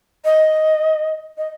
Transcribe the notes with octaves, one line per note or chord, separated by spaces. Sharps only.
D#5
D#5